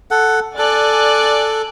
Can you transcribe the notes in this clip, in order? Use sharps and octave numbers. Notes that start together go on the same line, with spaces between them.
A4 F#5
A4 D5 G#5 F#6